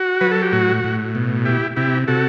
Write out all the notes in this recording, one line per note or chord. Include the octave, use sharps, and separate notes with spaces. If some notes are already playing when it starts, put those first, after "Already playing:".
Already playing: F#4
F#3 B4
A4
G4
A2 F#4
A2
B2
E4 G4
C3 E4 G4
C3 F#4 A4